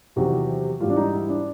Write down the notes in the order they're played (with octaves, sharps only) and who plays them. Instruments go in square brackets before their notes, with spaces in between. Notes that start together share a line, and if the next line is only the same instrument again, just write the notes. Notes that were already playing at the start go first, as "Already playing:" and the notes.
[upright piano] E2 C3 D#3 F#3 F#4
G#2 E3 G3 F4
D4
D#4
E4
D4